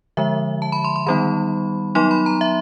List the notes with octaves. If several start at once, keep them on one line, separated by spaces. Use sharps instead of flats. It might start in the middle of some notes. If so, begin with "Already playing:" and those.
D3 F3 G#3 E5
A5
B5
C6
C6
D#3 G3 B3 D#4 B5
F#3 B3 D#4 C6
B5
A#5
E5